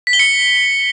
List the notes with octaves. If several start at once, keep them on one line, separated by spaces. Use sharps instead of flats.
B6
G7
C#7